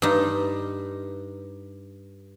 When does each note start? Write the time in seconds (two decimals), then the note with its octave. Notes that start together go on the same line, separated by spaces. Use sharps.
0.02 G2 D#4